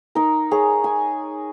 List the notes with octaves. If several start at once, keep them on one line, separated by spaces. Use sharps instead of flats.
D#4 A#4
G#4 C#5
G#5